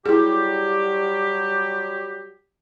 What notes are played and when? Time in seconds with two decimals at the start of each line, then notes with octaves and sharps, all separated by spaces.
0.06 F#3 G3 E4 G4 G#4